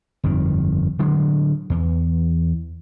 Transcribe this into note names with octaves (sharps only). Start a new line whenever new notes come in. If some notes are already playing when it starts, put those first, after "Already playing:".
G1 F2 D#3
D3 F#3 G#3
E2